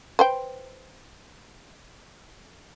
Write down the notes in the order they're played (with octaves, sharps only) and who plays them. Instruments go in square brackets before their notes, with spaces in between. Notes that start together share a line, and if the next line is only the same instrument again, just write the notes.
[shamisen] B4 C5 G5